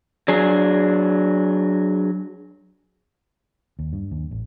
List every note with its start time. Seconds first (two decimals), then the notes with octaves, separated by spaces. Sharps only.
0.28 F#3 D4 G#4
3.79 D#2
3.93 G2
4.12 D#2
4.31 A1